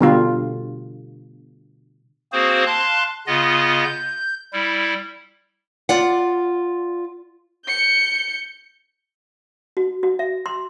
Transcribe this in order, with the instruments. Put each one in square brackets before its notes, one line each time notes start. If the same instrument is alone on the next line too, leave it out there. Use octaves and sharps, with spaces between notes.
[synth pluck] B2 [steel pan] D3 G3 F4
[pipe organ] A#3 C4 F#4 G#4 C5
F5 A5 C6 F#6
C#3 B3 F4 D#5
G6
G3 E4
[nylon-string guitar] F4 D5 F#5
[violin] G6 C#7
[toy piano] F#4
F#4
E5
C6